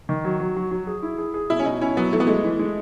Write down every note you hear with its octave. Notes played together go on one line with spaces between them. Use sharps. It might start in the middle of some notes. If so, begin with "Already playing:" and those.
D#3
F#3
F#3
F#3
F#3
G#4
E4
G#4
G#4
B2 E4
C#4
B2 D#4
C#4 E4
F#3 B3
E3 A3
B3
G#3 A3
E3
G#3